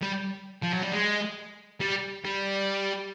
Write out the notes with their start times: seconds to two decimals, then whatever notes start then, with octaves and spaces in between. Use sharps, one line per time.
0.03 G3
0.62 F3
0.72 F#3
0.82 G3
0.92 G#3
1.81 G3
2.25 G3